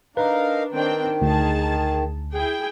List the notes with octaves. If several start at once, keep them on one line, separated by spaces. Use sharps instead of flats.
D4 D#4 A#4 B4 F5 A#5
D#3 C4 D4 G5
D2 D#4 G#4 A5
E4 G#4 G5